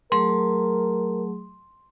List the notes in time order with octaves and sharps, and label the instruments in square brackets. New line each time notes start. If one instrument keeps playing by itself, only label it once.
[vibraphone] F#3 A3 G#4 [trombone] A#4 [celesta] C6